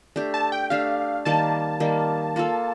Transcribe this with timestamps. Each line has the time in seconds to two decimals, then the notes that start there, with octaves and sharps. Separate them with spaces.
0.16 A3 D4 G4
0.34 A5
0.52 G5
0.70 A3 D4 G4 F5
1.25 D#3 G3 A#3 A5
1.80 D#3 G3 A#3
2.36 A#3 F4 A4